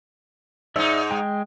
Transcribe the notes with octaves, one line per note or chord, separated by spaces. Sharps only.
G#2 D#4 D5 E5 E6
G#3 G5